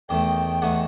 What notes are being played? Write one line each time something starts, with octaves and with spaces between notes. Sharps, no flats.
E2 D#3 A3 G5
E2 D#3 A3 F#5